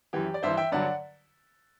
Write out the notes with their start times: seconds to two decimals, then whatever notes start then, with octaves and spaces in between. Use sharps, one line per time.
0.13 F#2 E3 G4
0.34 D5
0.43 G2 E3 C5 E5
0.57 E5 G5
0.72 G2 D3 F#3 D5 F#5